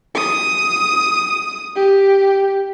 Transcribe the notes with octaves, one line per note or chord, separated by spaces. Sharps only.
D#6
G4